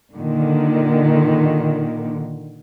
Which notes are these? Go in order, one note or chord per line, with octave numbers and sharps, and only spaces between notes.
A#2 D3 D#3